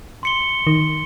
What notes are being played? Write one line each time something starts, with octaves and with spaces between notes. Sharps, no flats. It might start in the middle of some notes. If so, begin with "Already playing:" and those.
C6 C#7 G7
D#3